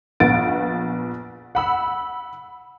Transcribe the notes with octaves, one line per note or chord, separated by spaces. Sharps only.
A#1 B3 A6 D7
F#5 B5 E6